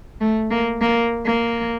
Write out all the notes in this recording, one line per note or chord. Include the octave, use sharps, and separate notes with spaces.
A3
A#3
A#3
A#3